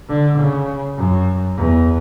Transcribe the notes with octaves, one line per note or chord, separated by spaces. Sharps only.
D3
C#3
F#2
E2